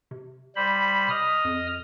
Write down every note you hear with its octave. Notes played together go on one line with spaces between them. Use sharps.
C3
G3 C5 B5
D#5 D#6 F6
F2